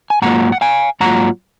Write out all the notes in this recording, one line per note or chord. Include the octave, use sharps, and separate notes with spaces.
G#5
G#2 F#3 A#3 F4 F#5 A#5
F#5
F5 G#5
G#2 F#3 A#3 F4 F#5 A#5